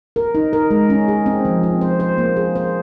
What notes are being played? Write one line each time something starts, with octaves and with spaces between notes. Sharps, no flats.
A#4
D#4
A#4
G#3
C#4
G#4
C4
F3
C4
C5
C5
A#3
G#4
C5